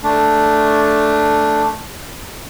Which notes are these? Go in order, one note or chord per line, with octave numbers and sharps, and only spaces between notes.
A3 D4